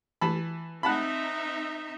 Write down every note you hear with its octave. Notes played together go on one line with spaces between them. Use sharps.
E3 A5 B5
C4 D#4 E5 F#5 A5 B5